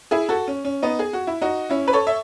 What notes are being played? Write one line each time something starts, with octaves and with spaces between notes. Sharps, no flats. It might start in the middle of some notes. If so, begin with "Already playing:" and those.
E4 G#4
F#4 A4
C#4
C#4
B3 D#4
G#4
F#4
E4
D#4 F#4
C#4 E4
B4
A4 C#5
E5